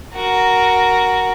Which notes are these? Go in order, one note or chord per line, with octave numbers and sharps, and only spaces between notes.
F#4 A#4